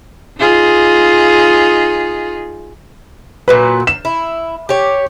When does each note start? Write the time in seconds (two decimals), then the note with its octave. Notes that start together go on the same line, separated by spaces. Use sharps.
0.40 D#4 F4 G#4
3.48 A#2 F#3 F#4 B4
3.87 E7
4.05 E4
4.69 G4 C#5